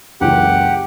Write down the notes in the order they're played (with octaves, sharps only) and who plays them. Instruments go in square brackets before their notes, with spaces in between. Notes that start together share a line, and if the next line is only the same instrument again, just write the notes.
[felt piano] F#1 C#2 E3 [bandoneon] G4 F#5